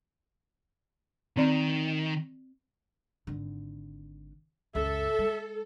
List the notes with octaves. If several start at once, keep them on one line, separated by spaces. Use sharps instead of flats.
D#3 C4 D5
G#1 D3
C#2 F#2 A4 E5
G#3